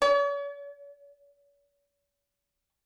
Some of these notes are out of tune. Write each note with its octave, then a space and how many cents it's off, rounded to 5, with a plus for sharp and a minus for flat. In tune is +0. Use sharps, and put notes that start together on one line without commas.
C#5 +45